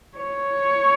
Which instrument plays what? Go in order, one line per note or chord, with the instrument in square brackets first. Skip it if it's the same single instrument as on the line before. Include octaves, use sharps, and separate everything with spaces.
[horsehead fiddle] C#5